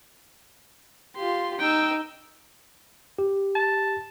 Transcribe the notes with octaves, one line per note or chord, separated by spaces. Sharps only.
F4 G4 C6
D#4 G5 E6
G4
A5